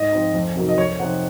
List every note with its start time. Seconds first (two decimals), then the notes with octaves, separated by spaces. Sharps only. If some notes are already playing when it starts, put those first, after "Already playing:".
Already playing: G#2 D#5
0.12 F3 C4 D#4
0.34 F2
0.56 C3 F#3 A#3 D#4
0.69 D#5
0.78 F2 C#5
0.99 C3 F3 C4 D#4 F#5